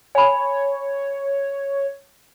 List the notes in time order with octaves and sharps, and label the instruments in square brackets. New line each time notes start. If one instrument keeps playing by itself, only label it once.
[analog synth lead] C#5 [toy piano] G#5 B5